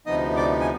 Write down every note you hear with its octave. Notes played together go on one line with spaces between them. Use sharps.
D2 C3 F3 B3 D#4 D#5 D#6
D5 D6
G#5